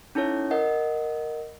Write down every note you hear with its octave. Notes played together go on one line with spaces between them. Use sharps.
C#4 D#4 E4 A4 C#5
A#4 D#5 F#5